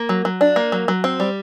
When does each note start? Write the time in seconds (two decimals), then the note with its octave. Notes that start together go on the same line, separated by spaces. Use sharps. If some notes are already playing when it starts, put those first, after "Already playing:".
Already playing: A#3
0.09 F#3
0.25 F#3
0.41 D4
0.56 A#3
0.72 F#3
0.88 F#3
1.04 C4
1.20 G3